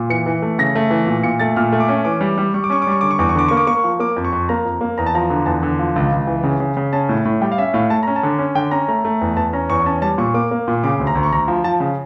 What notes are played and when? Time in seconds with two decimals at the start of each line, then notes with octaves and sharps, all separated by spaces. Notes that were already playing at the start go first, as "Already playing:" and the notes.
Already playing: A#2
0.10 E3 C#7
0.26 E3
0.42 A3
0.59 C#3 A#6
0.75 A3
0.91 E3
1.07 A#2
1.23 A#2 C#7
1.40 A3 A6
1.56 A#2 F6
1.72 A3
1.80 D6
1.89 C#4
2.05 E3 D6
2.21 G3
2.38 G3
2.54 G3 C#6
2.64 D6
2.70 C#4 C#6
2.82 D6
2.87 G3 C#6
3.01 D3 D6
3.11 C#6
3.19 E2 D6
3.29 C#6
3.35 D3 D6
3.48 A#3 C#6
3.57 D6
3.67 A#3 C#6
3.84 F3
4.00 A#3 D6
4.16 F2
4.25 C#6
4.33 F2
4.49 A#3 A#5
4.65 F2
4.81 A#3
4.98 E2 A#5
5.06 A5
5.15 F3 A#5
5.30 D3
5.46 E2 A5
5.63 D3
5.79 F3
5.96 C#2
6.12 C#2
6.27 E3
6.44 C#3
6.60 C#3
6.77 C#3
6.93 C#4 A5
7.09 A2
7.25 A2
7.41 G3 G5
7.52 F5
7.58 C#4 E5
7.74 A2 F5
7.90 A3 A5
8.03 C#4 A#5
8.16 A5
8.23 D3
8.39 C#4
8.55 D3 G5
8.71 C#4 A#5
8.88 A3 A#5
9.05 A3
9.21 E2
9.37 E2 A5
9.53 C#4 A#5
9.70 E2 C#6
9.86 C#4 A5
10.02 G3 A5
10.18 A#2 C#6
10.34 A#3 D6
10.51 A#3
10.68 A#2
10.83 C#3 D6
11.00 D2
11.07 A#5
11.15 D2
11.23 C#6
11.32 D2 A#5
11.48 F3
11.64 F3 A5
11.80 C#3